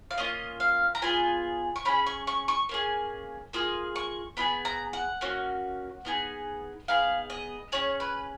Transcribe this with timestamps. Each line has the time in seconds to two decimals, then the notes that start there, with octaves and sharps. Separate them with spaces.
0.11 F5
0.18 A#3 C#4 F4 D#5
0.60 F5
0.95 A#5
1.02 B3 F4 G#4 G#5
1.76 C#6
1.85 C#4 F4 G#4 B5
2.06 C#6
2.27 C#6
2.48 C#6
2.69 A#3 C#4 G#4
3.53 A#3 F4 G#4 D#6
3.96 C#6
4.37 B3 F4 G#4 B5
4.65 A#5
4.93 F#5
5.21 A#3 C#4 F#4
6.05 B3 D#4 G#4
6.88 B3 D#4 G#4 F5
7.30 D#5
7.72 C#4 G#4 C#5
8.00 B4